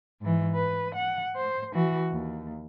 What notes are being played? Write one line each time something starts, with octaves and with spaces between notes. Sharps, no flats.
G#2 E3
B4
F#5
C5
E3 F#4
D#2